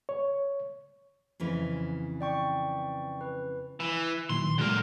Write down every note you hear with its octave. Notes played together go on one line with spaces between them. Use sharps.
C#5
F2 C#3 E3
D5 G5 C#6
B4
E3
A#2 D#3 F#3 C6
A#2 D3 F#3 G#3 A#4